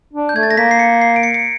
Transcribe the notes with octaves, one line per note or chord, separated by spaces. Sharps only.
D4
G6
A3 G#6
A6
A#6
A#3 B6
C7
C#7
C7
D7
C#7
C#7